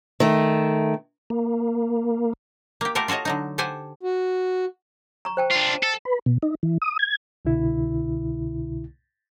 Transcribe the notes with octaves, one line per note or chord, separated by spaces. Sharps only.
D#3 A3
A#3
A#3 G4
A3 F4 G4 A4 A#4 F#5
F4 F#4 A4 C#5 D#5
D3 F#3 D#4
G4 A4 C5 F#5 G#5
F#4
A#5 C#6
C5 G5 A5
D4 F4
A4
B4
B2
D#4
E3
D#6
G#6
C2 B2 D3 E4